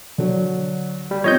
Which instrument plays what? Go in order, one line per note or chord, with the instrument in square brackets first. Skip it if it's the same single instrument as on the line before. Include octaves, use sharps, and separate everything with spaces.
[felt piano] D3 F#3
[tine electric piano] G3
[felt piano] B3 C4 F4 [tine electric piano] C#5 D#5 G6